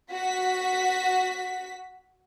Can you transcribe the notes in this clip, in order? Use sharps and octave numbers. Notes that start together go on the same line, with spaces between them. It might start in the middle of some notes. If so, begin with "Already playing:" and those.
F#4 B6